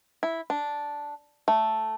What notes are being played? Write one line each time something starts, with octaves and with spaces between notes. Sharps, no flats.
E4
D4
A3